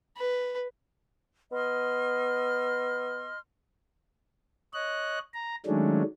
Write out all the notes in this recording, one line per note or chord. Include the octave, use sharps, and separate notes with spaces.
B4
B3 D#5 C6 F6
C#5 D#5 F#6
A#5
D#3 F#3 G#3 A3 C#4 D4